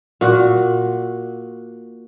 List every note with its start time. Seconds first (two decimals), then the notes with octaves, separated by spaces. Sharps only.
0.21 A#2 F#4